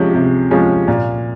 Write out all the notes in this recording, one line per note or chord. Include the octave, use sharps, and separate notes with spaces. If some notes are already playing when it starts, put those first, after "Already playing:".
Already playing: C3 F3 G#3 C#4
C3
F3 G#3 C#4
A#2